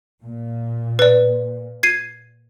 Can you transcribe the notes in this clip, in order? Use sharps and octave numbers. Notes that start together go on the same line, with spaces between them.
A#2
B4 D5
G#6 C7 D#7